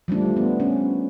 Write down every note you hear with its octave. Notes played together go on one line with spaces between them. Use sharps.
F3 G3 A3 D4
B3
C#4